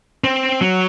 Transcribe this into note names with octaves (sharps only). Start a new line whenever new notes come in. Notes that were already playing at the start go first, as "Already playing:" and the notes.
C4
F#3